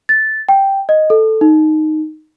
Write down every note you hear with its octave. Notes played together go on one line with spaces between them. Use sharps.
A6
G5
D#5
A4
D#4